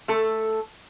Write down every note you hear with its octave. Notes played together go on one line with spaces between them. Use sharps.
A3 A4